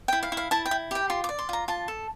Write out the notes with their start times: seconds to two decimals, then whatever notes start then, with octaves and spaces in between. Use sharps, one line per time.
0.08 E4 G5
0.23 F5
0.32 E4
0.37 F5
0.51 E4 A5
0.66 G5
0.71 E4
0.91 G4 G5
1.10 F4 C6
1.24 D6
1.29 D5
1.39 C6
1.49 F4 A#5
1.68 F4 A5
1.88 A4